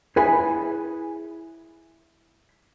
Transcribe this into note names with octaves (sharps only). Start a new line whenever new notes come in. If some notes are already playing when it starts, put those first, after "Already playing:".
E4 G#4 B4 G#5 B5